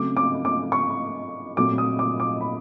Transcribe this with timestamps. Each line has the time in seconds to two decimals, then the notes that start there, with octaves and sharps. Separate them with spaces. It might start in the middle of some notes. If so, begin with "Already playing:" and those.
Already playing: C#3 F#3 A3 C4 D6
0.17 D6
0.45 D6
0.72 C#6
1.57 A#2 F#3 A3 C4 D6
1.78 D#6
1.99 D6
2.20 D6
2.41 B5